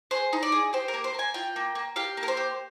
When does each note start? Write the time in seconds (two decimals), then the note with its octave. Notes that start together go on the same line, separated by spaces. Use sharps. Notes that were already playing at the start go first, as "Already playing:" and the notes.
0.11 G#4 C5
0.33 D#4
0.43 D5
0.52 G#4
0.73 G4 C5
0.88 A#4
0.94 A#3
1.04 C5
1.14 A#3 G#5
1.34 F4 G5
1.56 A#3
1.75 A#3
1.96 G4 F5
2.17 A#3
2.23 A#4
2.28 C5
2.37 G4